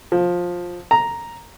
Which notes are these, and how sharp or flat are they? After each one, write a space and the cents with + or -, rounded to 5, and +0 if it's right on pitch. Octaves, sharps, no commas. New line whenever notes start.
F3 +15
A#5 +0